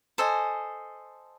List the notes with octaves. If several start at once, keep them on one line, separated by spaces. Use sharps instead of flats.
A4 C5 D#5 G#5